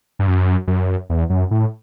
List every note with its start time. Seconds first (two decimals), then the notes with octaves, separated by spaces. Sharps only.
0.19 G2
0.27 F#2
0.67 F#2
1.10 E2
1.30 F#2
1.51 A2